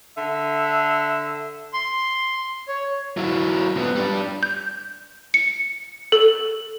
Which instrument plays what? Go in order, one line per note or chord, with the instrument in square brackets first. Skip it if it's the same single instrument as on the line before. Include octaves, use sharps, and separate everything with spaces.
[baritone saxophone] D3 [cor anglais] E5
[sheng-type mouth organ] C6
C#5
[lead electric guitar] F#3 E4
F3 B3
G3 D4
[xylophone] G6
C#7
A4